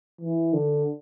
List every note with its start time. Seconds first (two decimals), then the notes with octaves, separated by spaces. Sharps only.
0.21 E3
0.54 D3